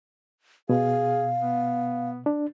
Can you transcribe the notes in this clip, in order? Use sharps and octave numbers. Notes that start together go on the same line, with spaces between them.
B2 G#4 F5
B3
D4